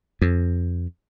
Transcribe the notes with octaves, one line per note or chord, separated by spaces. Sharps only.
F2